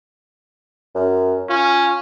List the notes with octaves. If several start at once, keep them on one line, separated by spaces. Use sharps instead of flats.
F#2
C#4 F4